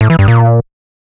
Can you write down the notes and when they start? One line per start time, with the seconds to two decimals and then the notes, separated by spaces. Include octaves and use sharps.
0.01 A2
0.10 E3
0.19 G2
0.28 A#2